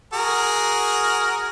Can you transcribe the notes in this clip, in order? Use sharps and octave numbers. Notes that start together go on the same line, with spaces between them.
F#4 G#4 A#4